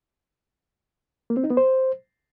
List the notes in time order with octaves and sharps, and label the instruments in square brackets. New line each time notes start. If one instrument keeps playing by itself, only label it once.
[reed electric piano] A#3
C4
D#4
B3
C5